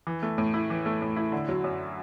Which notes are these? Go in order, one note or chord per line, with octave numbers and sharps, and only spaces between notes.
E3
A3
A2
E4
E3
A3
A2
E4
D3
F#3
F#2